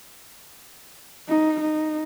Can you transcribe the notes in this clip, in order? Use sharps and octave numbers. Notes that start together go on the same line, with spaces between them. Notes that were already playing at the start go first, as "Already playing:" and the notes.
D#4
D#4